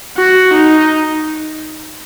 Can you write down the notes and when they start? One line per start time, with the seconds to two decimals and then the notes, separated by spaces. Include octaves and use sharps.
0.17 F#4
0.53 D#4